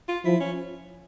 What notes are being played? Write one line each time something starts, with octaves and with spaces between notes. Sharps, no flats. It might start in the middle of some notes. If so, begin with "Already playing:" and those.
F4
F3 E4
C#4